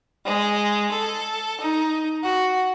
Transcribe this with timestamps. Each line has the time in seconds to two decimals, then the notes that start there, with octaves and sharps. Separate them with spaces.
0.24 G#3
0.91 A4
1.59 D#4
2.22 F#4